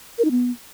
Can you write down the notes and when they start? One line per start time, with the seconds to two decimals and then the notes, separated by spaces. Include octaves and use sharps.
0.18 A#4
0.25 D#4
0.31 B3